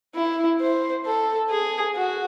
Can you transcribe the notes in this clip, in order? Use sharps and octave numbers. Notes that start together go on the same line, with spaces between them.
E4
C5
A4
G#4
F#4